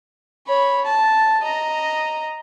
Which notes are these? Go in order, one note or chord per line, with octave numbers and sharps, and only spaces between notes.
C#5 B5
A5
D#5 A#5